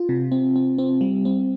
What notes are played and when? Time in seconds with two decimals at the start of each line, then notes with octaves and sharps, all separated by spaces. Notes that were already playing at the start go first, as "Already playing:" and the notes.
Already playing: F4
0.09 C3
0.32 C4
0.56 C4
0.78 C4
1.01 G3
1.25 C4